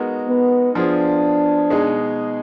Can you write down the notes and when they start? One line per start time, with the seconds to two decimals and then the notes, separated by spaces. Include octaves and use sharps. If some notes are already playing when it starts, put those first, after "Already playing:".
Already playing: G#3 B3 D#4 F#4 A#4
0.29 B3
0.75 F3 B3 D4 F4 G#4
1.70 B2 G#3 D#4 G#4